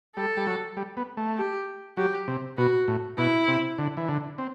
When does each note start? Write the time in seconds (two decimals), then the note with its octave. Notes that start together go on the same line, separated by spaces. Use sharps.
0.16 G3 A4
0.37 G3
0.47 F#3
0.77 G3
0.97 B3
1.17 A3
1.37 G4
1.97 F#3 G4
2.28 C3
2.57 B2 F#4
2.88 A2
3.18 B2 E4
3.48 C3
3.78 D3
3.97 E3
4.09 D3
4.38 C4